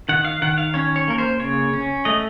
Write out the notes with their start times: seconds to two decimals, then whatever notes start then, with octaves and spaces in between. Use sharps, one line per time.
0.09 D#3 F#5
0.25 F5
0.42 D#3 F#5
0.58 F5
0.74 C#4 C#5
0.96 C#5
1.08 A#3 A#4
1.18 C5
1.39 C#3 C#5
1.73 C#4
2.05 A3 D#5